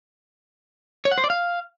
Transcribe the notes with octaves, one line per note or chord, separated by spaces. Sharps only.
C#5
F#5
C5
D5
F5